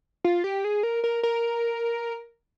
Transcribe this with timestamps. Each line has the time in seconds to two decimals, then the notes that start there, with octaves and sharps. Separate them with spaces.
0.24 F4
0.44 G4
0.64 G#4
0.83 A#4
1.04 A#4
1.23 A#4